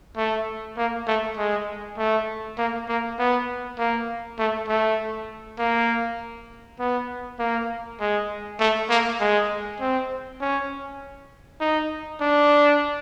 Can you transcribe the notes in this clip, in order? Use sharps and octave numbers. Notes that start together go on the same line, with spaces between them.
A3
A#3
A3
G#3
A3
A#3
A#3
B3
A#3
A3
A3
A#3
B3
A#3
G#3
A3
A#3
G#3
C4
C#4
D#4
D4